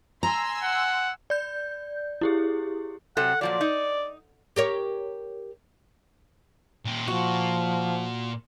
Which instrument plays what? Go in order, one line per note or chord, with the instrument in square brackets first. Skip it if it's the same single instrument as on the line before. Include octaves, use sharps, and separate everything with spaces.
[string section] G#5 C6 E6 [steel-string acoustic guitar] A#5
[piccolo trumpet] F#5
[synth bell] D5 G6
E4 G4 G#4
[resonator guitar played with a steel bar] C3 F#3 A4 [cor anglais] F#5
[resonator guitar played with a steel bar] A#2 F3 F#3 [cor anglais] D5
[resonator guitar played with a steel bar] D#4
[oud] G4 A#4 C#5
[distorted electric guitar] A#2 G4
[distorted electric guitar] A#2 [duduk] F3 [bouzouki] F#4